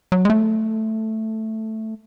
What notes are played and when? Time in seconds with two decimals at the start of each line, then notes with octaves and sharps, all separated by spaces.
0.12 F#3
0.25 G#3
0.30 A3